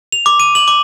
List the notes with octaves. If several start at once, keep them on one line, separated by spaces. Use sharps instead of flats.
F7
D6
D#7
F#7
D6